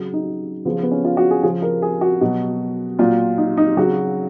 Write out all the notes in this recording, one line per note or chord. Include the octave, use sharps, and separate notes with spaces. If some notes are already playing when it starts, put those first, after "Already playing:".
Already playing: C#3 F#3
D#4
C#3 F3 B3
B3
C#4
F4
F#4
G#4
C#3 F3 G#4
A#4
G#4
F#4
B2 F#3
A#2 F#3 F4
D#4
D#4
C#3 F#3 F#4